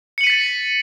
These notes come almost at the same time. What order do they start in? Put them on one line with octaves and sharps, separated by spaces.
C#7 F#7 D#7 B6 A6